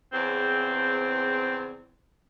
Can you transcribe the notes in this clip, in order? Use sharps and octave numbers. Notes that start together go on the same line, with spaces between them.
E2 C#3 C4